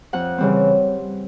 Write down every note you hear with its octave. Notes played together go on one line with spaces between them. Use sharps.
F2 F#5
C#3 E3 G3 C4